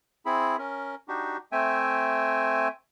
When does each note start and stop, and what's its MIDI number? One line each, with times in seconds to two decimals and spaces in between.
0.26 0.56 60
0.26 0.56 64
0.26 0.56 68
0.26 0.56 83
0.58 0.95 61
0.58 0.95 70
1.08 1.37 62
1.08 1.37 63
1.08 1.37 66
1.08 1.37 67
1.52 2.68 57
1.52 2.68 60
1.52 2.68 76
1.52 2.68 79
1.52 2.68 80